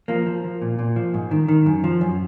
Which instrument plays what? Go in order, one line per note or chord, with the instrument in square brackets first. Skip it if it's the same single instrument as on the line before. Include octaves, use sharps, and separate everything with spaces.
[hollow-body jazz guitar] F3 A#3
F3
F3
A#2
A#2
F3
G#2
D#3
D#3
F#2
F3
F#2